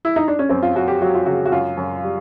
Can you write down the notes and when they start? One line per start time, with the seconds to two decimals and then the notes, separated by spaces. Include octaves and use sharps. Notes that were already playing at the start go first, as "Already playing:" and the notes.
0.05 E4
0.16 D#4
0.28 D4
0.39 C#4
0.49 F#2 C4
0.62 F4
0.75 F#2 F#4
0.88 G4
1.01 F#3 F#4
1.15 F4
1.26 C#3 F#4
1.45 F#4
1.52 F#2 F4
1.77 F#2
2.04 G3